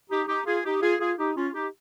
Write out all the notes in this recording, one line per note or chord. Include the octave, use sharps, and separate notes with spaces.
D#4 G4
D#4 G4
F4 G#4
D#4 G4
F4 G#4
F4 G#4
D#4 G4
C#4 F4
D#4 G4